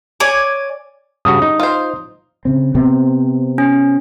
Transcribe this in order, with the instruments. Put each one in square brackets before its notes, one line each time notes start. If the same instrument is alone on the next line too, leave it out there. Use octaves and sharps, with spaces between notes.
[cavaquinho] C#5 D5 G#5 D6
[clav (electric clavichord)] G2 C#3 F#4 [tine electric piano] D#6
[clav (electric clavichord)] D#4
[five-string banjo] F4 C5
[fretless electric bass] C#3 C4
C3 B3 C4
[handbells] C#4